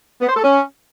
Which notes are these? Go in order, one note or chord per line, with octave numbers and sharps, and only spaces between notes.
B3
C5
A4
C#4